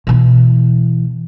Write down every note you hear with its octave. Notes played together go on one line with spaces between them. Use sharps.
B2 E3